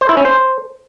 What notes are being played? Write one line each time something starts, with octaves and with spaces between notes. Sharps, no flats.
C5
E4
C#4
C5